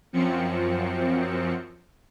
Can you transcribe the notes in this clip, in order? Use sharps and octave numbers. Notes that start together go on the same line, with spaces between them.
F#2 F3 C4 C#7